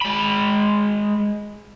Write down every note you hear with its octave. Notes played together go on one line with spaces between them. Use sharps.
G#3 B5